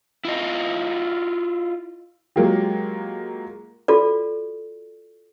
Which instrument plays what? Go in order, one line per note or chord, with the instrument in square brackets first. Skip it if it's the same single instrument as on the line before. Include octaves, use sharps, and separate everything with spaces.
[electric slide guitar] E4 F4 D#5
[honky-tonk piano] F#3 G#3 A#3 F4 G4
[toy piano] F4 F#4 A4 D5